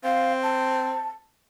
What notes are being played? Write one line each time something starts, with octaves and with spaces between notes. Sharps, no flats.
C4 F5
A5